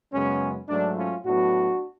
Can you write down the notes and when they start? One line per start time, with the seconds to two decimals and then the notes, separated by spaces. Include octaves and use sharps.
0.12 F#2 C#3 G#3 B3 C#4
0.69 G#2 F#3 A3 D4
0.97 C#4 F4
1.25 A2 F#3 B3 D4 F#4